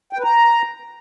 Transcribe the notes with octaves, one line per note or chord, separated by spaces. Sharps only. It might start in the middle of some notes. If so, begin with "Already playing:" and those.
G5
B4
A#5